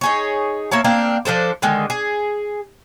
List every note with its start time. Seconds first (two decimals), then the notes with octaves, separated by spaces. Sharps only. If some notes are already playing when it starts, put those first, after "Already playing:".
0.01 D#4 G#4 C#5
0.71 A#3 E4 C#5 A5
0.84 A#3 C4 D4 F5
1.25 F3 D4 A4 C5
1.62 D3 D#3 G#3
1.90 G#4